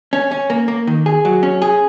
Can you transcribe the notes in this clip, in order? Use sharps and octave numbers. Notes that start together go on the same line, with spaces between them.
C#4
C#4
A#3
A#3
D#3
G#4
F#3
C#4
G#4